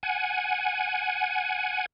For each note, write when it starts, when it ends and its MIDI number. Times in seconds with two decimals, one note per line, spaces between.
0.03 1.86 78
0.03 1.86 80